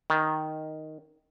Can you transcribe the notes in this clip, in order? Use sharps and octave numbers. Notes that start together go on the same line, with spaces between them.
D#3